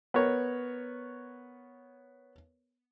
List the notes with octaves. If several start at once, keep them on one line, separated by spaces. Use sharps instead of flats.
B3 A#4 C#5